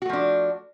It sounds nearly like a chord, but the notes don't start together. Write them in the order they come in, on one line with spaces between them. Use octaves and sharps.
F#4 A3 F3 D4